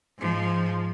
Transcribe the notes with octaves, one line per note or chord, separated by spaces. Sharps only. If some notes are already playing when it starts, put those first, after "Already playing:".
G#2 F3